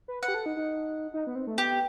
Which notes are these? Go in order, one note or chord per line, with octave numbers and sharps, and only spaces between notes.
B4
B4 F#5
G4
A4
D#4
D#4
D#4
B3
C4
A3
B3 G4